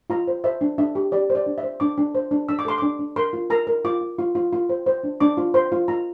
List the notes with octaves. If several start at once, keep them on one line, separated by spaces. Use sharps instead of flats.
F4 A#5
C5
C5 E5
D4
D4 E5
G4
G4 D5
C5
D5
D4
E5
C5
D4 D6
D4
C5
D4
D4 E6
D6
A4 C6
D4 D6
D4
A#4 C6
F4
A#4 A#5
A#4
F4 D6
F4
F4
F4
F4
C5
C5
D4
D4 D6
F4
C5 C6
F4
F4 A#5